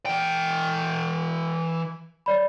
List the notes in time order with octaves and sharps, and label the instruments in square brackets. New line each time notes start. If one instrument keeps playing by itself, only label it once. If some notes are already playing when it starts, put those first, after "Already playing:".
[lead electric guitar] E3 G5
[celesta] C#5 D5 B5